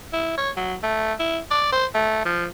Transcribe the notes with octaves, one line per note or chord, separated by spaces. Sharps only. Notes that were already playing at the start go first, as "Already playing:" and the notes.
E4
C#5
F#3
A3
E4
D5
C5
A3
F3